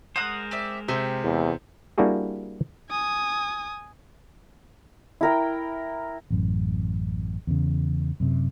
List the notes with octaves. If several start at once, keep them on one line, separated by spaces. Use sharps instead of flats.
G#3 A#4 C5 F#5 D#6
C4 D5 E5
C3 G#4 E5 G5
E2
G3 A#3 D4 E4 F#4 G#4
G#5 D#6
E4 A#4 G5
A1 F#2
E2 C#3
F#2 C3